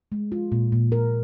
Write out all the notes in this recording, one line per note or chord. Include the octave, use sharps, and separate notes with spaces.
G#3
F4
A#2
A#2
A#4